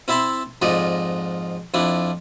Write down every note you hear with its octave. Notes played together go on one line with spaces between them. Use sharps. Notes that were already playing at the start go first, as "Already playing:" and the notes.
C4 E4 E5 A5 B5 C6
F2 G#2 F3 D5 D#5
F2 F3 D4 E4